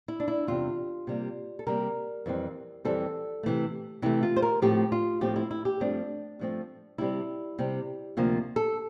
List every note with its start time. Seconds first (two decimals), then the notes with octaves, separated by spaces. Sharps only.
0.08 E4
0.20 D4
0.28 E4
0.47 E2 C3 G3 C4 F4
1.07 C3 G3 A#3
1.59 A4
1.66 C3 G3 A#3 A#4
2.26 F2 E3 G3 C4
2.85 F2 E3 G3 C4 A4
3.43 C3 E3 A3
4.02 C3 E3 A3 E4
4.23 F4
4.36 C5
4.42 A#4
4.62 A2 F3 A3 C4 G4
4.92 F4
5.21 A2 F3 A3 C4 G4
5.36 E4
5.51 E4
5.65 G4
5.80 G2 F3 A3 C4 D4
6.39 G2 F3 A3 C4
6.98 C3 G3 C4 E4
7.59 C3 G3 C4
8.17 D2 C3 F3 A#3 F4
8.56 A4